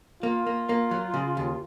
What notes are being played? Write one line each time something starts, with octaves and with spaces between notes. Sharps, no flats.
A#3 F4
A#3
A#3
F#3
C#3
D#2